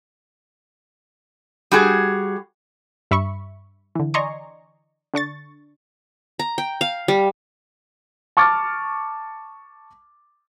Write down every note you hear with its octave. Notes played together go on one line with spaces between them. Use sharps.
G3 F#4 G#4
G2 E5 B5 C#6
D3 E3
D5 D#5 G#5 A#5 C6 C#6
D3 D4 C#6 A6
A#5
G5
F5
G3
A5 C#6 D6 F6 A6